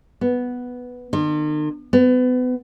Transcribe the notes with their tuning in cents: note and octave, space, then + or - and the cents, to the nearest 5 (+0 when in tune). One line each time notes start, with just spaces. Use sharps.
B3 +0
D#3 -45
B3 +30